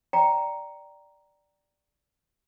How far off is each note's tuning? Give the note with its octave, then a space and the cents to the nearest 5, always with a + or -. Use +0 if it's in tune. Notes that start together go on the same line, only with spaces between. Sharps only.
D5 +0 G5 -15 A#5 +0